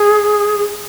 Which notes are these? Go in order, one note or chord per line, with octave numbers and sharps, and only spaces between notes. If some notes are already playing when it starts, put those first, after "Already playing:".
Already playing: G#4